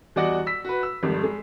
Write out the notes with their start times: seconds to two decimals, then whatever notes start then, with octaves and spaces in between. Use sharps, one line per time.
0.16 E2 G3 F#4 D5 D#5 F#5
0.46 E6 B6
0.65 F#4 B4
0.83 E6
1.03 G#1 F2 G3
1.23 G#3